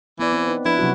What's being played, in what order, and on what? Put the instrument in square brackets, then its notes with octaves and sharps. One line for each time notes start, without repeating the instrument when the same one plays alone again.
[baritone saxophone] E3 [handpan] B3 D5
[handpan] C4
D#4 B4
[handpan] F3 D4 B4 [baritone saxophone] E4
[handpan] C3 F#3 F#4